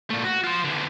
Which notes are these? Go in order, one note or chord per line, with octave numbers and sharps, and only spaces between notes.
A#2 A3
F#4
F4 C5
E2 D3